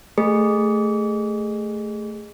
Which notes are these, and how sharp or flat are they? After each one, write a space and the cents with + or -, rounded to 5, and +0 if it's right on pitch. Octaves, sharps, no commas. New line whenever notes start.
A3 +0 G#4 -15